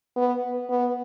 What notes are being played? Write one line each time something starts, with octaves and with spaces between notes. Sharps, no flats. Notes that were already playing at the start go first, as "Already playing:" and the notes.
B3
B3